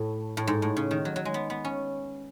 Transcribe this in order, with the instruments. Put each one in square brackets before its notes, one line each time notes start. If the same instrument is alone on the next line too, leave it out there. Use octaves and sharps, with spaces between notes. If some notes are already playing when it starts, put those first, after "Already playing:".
Already playing: [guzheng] A2
A2
G#2
A2
C#3
D#3
F#3
F#3
G#3
B3
B3
C#4